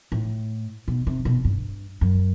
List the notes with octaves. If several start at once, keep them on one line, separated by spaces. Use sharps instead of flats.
A2
B2
C3
B2
G2
F#2